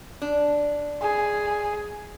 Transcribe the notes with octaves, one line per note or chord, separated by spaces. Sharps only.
D4
G#4